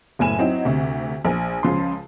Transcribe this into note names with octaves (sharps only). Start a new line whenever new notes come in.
F#1 A2 G#5 E7
F#3 C4 D#4 E4
D2 C3
A#1 G#5
C#2 C#3 F3 C6